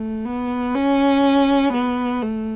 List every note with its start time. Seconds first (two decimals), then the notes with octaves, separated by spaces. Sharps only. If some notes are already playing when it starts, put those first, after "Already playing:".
Already playing: A3
0.25 B3
0.75 C#4
1.73 B3
2.22 A3